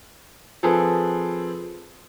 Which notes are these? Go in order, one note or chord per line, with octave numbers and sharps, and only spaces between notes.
F3 C4 G#4 A4 B4